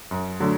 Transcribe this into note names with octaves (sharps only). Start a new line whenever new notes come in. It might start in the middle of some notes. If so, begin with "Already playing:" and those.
F#2
D3 F#3 A3